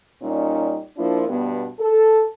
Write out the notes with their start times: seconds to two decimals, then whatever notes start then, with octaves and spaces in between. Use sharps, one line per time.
0.22 A#2 G3 C#4 D#4
0.97 F3 A#3 D4 E4 F4
1.29 G2 B2 B3
1.80 A4